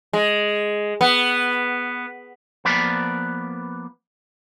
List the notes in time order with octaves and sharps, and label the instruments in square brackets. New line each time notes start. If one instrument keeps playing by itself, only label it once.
[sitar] G#3
B3
[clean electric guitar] F3 A#3 B3 B4 D5